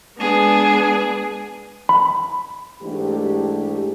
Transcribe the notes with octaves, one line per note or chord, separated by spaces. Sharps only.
G#3 B3 D4 G#4
B5
G#2 E3 A3 D4 G4